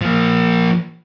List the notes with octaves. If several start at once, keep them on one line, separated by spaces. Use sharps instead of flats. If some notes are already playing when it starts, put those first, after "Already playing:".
F3 A#3